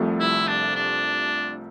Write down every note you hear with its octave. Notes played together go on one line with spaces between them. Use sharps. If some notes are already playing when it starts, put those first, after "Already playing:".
Already playing: C2 C3 F3 A3
E4
D4
D4